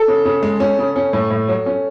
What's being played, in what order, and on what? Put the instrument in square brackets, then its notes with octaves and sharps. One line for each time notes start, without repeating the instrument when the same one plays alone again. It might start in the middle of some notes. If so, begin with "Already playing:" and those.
Already playing: [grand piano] A4
[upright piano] C#3
C#3
G#3
C#4
C#3
C#4
A2
A2
F#3
C#4